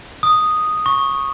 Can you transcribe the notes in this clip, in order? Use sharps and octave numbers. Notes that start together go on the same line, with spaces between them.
D#6
C#6